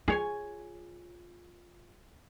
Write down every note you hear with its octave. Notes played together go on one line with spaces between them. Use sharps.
F4 G#4 C#5 G#5